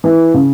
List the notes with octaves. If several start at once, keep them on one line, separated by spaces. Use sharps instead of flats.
E3
C#3